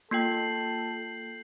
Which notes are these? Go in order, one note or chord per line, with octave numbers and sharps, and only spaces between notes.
A#3 F4 A4 G5 G6 C7 F#7